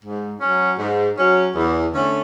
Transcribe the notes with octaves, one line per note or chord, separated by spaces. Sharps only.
G#2
F#3 C#4
G#2
F#3 C#4
E2
D3 A3 C#4